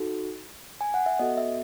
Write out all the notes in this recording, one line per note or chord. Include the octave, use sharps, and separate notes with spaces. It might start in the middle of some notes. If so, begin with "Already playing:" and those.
Already playing: D#4 F#4 A4
G#5
F#5
E5
B3 F#4 A4 D#5
E5